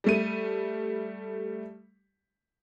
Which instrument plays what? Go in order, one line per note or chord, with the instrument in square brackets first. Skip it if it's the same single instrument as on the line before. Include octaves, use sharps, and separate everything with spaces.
[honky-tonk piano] G3 A3 D#7